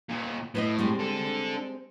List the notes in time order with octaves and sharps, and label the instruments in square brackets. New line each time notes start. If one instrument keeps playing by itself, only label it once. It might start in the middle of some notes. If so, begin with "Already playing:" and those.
[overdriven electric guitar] D#2 A#2
[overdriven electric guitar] A2 [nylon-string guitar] B4 C5 D#5
[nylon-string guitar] G3 G#3 C4
[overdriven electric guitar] D4 A4